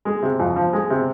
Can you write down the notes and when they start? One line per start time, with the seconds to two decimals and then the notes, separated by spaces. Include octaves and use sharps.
0.05 G#3
0.22 C3
0.40 F2
0.56 F3
0.73 G#3
0.90 C3